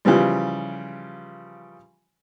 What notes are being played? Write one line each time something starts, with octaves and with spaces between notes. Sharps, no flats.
C#3 E3 F3 G3